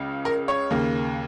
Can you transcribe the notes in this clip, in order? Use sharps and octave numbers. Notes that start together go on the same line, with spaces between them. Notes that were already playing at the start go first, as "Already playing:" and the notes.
Already playing: C#2 C#3
A#4
C#5
D#2 C#3 A#3